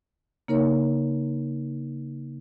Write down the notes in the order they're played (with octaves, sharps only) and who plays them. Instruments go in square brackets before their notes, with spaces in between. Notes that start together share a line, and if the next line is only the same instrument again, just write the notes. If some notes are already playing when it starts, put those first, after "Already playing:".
[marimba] C#3 A#3 D#4 A#4 C#5